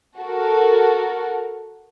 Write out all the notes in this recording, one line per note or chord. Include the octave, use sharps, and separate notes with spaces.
F#4 A4 A#4